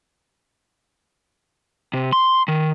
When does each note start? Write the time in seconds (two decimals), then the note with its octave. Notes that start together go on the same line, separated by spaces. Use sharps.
1.94 C3
2.13 C6
2.48 D#3